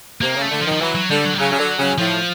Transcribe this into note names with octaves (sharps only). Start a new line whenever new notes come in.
C3 A#3
C#3
A3
D3
F3
D#3
F3
E3 F#3
F#3
D3 G3
F#3
G3
C#3 F#3
C#3
D3
C#3
A2 F3